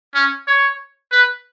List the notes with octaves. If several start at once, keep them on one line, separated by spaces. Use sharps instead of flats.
C#4
C#5
B4